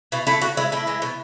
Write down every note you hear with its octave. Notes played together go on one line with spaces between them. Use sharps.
B2 E4
A3 E4
D3 F#4
G#3 E4
A2 E4
E3 G#3
B2